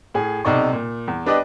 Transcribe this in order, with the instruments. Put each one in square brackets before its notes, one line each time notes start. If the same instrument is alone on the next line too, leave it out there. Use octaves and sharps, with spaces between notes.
[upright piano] A2 G#4
B1 C3 D#4 D5 C#6
A#2
E2
B3 D4 G4 B4 D5 D#5